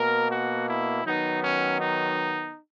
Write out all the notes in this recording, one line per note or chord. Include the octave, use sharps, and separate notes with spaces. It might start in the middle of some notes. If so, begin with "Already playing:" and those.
Already playing: B2 A#3 A#4
F#4
E4
D#3 F#3 B3 D#4
C#4
D#4